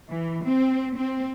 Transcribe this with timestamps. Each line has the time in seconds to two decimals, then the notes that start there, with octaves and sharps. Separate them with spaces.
0.10 E3
0.45 C4
0.97 C4